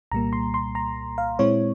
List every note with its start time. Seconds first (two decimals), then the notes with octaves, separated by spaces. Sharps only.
0.12 C2 A#2 G3 A#3 A#5
0.33 C6
0.54 C6
0.75 A#5
1.18 F5
1.39 A#2 G#3 C4 E4 C#5